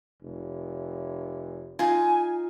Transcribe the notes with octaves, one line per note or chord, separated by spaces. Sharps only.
F1
D#4 F4 G#5